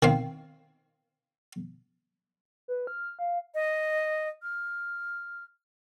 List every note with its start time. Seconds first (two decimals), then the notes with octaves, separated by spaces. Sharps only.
0.03 D#3 C4 F5
2.68 B4
2.87 F6
3.19 F5
3.55 D#5
4.43 F6